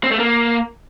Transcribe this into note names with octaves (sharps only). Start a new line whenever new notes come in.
C4
A3
A#3